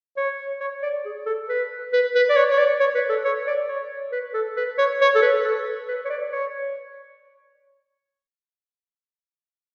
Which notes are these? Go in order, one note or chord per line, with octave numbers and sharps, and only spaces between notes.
C#5
C#5
D5
G#4
A4
B4
B4
B4
D5
C#5
C#5
D5
C#5
B4
A4
C#5
D5
C#5
B4
A4
B4
C#5
C#5
A4
B4
A4
B4
C#5
D5
C#5